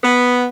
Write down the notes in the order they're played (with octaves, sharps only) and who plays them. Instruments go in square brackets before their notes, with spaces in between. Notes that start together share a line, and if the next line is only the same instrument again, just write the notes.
[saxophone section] B3